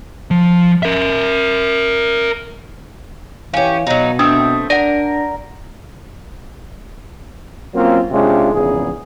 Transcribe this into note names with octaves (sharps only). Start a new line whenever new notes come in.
F3
A#4 E5
E3 C#4 G4 C#5 F5
B2 F#3 D#4
A3 C4 D4 E5 D#6
D4 A#4 D5 F#5 A#6
F#3 A#3 C4 C#4 F4
C3 G#3 C#4 D4 F4
A#1 E2 G#2 C#3 G#4